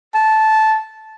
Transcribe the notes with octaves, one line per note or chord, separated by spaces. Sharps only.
A5